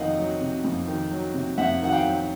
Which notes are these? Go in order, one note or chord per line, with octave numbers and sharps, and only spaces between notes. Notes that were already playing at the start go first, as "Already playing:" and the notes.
Already playing: F2 C3 D#3 D#5 F5 F#5
F#3
C3
F2
D#3
F#3
C3
F2 E5 F#5
D#3 F#5
F5 G5
F#3